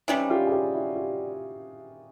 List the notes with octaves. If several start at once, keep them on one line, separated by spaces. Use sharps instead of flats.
C3 E3 G3 C#4 D#4
F4 G4
G#4
F4 G4
E4 F#4
F4 G4